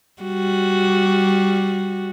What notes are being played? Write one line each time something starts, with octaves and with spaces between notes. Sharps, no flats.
G3 F#4